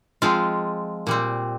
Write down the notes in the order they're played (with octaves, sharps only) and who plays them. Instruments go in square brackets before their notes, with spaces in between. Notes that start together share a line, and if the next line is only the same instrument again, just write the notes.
[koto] F3 G#3 C4 F4
A#2 G3 C4